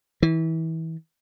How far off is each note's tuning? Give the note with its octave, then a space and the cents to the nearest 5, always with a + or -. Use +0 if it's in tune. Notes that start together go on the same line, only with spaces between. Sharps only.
E3 -30